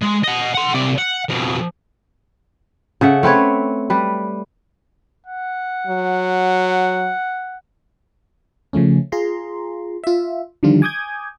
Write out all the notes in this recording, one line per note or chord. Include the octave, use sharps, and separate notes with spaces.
G#3
D#5 F#5
F#5 C6
C3 D5
F#5
F2 B2
C#3 A4 E5 F#5
A3 C4 B4 C#5
G3 B4
F#5
F#3
C#3 F3 A3 C#4
F4 G#4 A#5 C6
F4 E5
D3 D#3 F3 G3 D4 F4
G#5 D6 D#6 G6 G#6